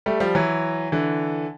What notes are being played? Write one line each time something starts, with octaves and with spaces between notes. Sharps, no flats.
G3 A3
F3 G3
E3 F#3
D3 E3